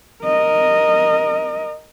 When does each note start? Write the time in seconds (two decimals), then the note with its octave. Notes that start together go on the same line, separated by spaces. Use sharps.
0.23 A#4 D#5